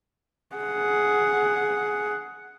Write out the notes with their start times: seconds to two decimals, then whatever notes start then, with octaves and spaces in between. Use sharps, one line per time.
0.56 G#4 F#5